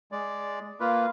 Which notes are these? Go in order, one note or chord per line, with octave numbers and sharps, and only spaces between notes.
G#3 D5
A#3 F4 B4 F5